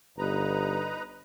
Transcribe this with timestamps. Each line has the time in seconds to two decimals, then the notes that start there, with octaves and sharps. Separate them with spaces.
0.18 G1 D#4 B4 A#5